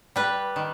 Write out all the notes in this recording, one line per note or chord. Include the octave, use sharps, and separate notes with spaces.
G3 B4
D#3